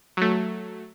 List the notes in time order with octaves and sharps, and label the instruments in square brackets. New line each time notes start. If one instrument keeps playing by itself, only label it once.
[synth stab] F#3 A3